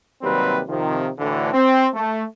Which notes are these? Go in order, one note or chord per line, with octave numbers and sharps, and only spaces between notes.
D#2 C3 F#3 G3 C4 B4
C3 D#3 F3
D2 A2 D3 E3
C4
A3